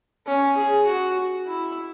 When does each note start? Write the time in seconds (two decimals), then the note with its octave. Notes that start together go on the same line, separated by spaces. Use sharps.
0.26 C#4
0.56 G#4
0.86 F#4
1.46 E4